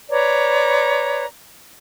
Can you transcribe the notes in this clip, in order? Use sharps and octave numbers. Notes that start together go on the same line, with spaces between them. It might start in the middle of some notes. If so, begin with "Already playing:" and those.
B4 C#5 D5 A#5